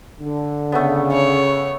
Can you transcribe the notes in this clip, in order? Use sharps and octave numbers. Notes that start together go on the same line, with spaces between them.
D3
C#3 A3 B3
C#5